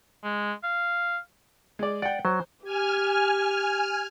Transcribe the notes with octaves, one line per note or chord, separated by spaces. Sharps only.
G#3
F5
G#3 D5
D5 F#5 G5
F#3 C5
G4 G#5 F6